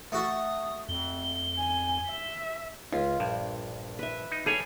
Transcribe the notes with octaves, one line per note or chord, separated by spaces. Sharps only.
A3 F#4 A4 D#6
F2 G7
G#5
E5
C#2 F4
A#1 G2
B4 E5
D#4
G3 G#4 A4 C#5 G#5 B5